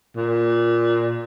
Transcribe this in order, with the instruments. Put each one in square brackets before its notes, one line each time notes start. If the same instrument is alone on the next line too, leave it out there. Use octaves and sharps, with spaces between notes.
[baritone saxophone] A#2